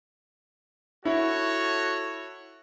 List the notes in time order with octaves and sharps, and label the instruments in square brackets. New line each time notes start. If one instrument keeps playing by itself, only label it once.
[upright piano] E4 [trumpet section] F#4 A4 C#5